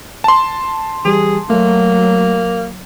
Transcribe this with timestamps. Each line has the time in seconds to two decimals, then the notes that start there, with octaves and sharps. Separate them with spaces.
0.24 A5 C6
1.05 E3 G3 G4 G#4
1.50 F#3 A3 A#3